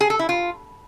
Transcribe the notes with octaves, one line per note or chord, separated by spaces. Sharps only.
G#4
A4
E4
F4